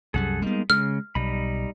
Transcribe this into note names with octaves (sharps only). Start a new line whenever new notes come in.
C2 F#2 G3 G#4 A4 F#5
G3 G#3 A#3 B3 D#4
C#3 G#3 F6
B1 G3 D#4 B5